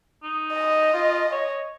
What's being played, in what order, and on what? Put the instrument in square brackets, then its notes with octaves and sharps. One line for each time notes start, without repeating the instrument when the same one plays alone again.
[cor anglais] D#4
[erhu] D#5
[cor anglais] F4
C#5